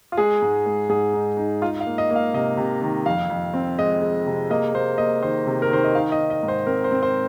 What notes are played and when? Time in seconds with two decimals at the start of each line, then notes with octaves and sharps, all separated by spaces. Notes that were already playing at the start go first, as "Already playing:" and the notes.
0.12 F4
0.18 G#3 G#4
0.42 G#2
0.66 G#3
0.89 G#2 G#4
1.13 D#4
1.37 D#4
1.62 D#4 F4
1.80 F5
1.86 A#3
1.98 D#5
2.10 A#3
2.16 F5
2.34 C3 D#5
2.57 C3
2.82 D#3
3.06 F2 F5
3.30 F2
3.54 C4
3.79 G#3 D#5
4.01 G#3
4.26 C3
4.50 A#3 D#5
4.74 A#3 C5
4.98 A#3 D#5
5.22 D#3 C5
5.46 C3
5.62 A#4
5.70 D#3 C5
5.84 D#5
5.94 D#4 F5
6.12 D#5
6.19 D#4
6.30 D#5
6.43 G#2
6.48 C5
6.67 C4 A#4
6.84 C5
6.91 C4
7.03 C5